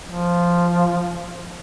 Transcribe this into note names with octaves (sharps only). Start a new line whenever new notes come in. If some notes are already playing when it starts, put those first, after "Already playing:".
F3